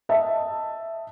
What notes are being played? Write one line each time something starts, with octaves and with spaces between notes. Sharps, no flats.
D#5 E5 A5